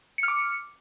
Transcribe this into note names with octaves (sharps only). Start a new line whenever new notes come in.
D6 F6 C#7